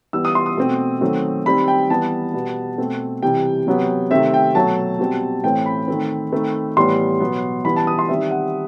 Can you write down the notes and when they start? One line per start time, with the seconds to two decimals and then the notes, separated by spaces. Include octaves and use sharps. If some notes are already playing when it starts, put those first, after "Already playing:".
0.13 E3 G3 B3 E6
0.25 D#6
0.35 C6
0.46 D#6
0.57 B2 A3 C4
1.01 D#3 F#3 A3 C4
1.45 D#3 G3 C4 B5
1.68 G5
1.90 E3 G3 B3 A5
2.34 B2 G3 B3
2.78 B2 A3 C4
3.23 C3 E3 G3 G5
3.67 C3 F#3 B3
4.11 C3 D#3 A3 C4 E5
4.34 G5
4.55 B2 F#3 A3 A5
4.99 B2 G3 C4
5.44 A2 E3 A3 C4 G5
5.66 B5
5.88 D#3 A3 C4
6.32 D#3 A3 C4
6.77 A2 E3 G3 B3 C6
7.20 B2 F#3 B3
7.65 E3 G3 B3 B5
7.76 A5
7.87 D#6
7.99 C6
8.09 D#3 G3 C4 E5
8.31 F#5